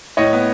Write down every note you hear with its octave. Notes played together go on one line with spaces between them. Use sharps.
A2 C#5 D#5
B3